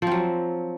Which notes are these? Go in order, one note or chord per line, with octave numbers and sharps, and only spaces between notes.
F3 F#3 C4